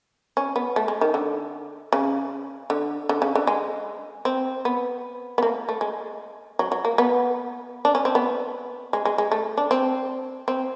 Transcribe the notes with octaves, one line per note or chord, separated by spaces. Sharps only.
C#4
B3
A3
G#3
D#3
D3
C#3
D3
D3
C#3
D3
G#3
C4
B3
B3
A#3
A3
G#3
F#3
F#3
A#3
B3
D4
C#4
C4
B3
G#3
G#3
G#3
A3
D4
C4
C4